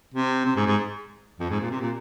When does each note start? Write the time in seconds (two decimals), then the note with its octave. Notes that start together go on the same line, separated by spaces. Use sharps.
0.14 C3
0.45 C3
0.56 G#2
0.67 G#2
1.40 F2
1.50 G#2
1.60 A#2
1.71 C3
1.81 A#2